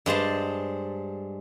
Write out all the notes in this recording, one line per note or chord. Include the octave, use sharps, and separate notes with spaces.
G2 G#3 C5 A5